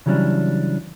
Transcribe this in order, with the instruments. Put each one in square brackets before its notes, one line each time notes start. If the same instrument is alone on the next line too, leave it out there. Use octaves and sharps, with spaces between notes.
[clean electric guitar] C#3 E3 F#3 G3 C#4 D4